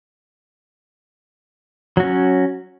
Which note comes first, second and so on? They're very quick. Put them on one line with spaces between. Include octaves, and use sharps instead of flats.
F#3 F#4 C#4